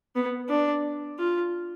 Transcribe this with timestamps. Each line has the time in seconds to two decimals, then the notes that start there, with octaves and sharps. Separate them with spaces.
0.16 B3
0.49 D4
1.19 F4